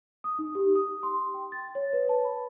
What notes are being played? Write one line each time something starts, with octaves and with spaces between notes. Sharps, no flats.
D#6
D#4
G4
D#6
C6
G5
A6
C#5
B4
A5
B5